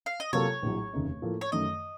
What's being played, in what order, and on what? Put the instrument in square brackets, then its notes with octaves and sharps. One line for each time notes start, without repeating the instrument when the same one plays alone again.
[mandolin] F5
D#5
[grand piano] C3 F#3 A#3 F4 A4 [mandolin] C#5
[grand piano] A#1 A2 F#3
F1 D#2 C#3 A3 D#4
A2 F3 A#3 F4 A4
[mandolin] C#5
[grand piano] F#2 D#3 A3 [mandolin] D#5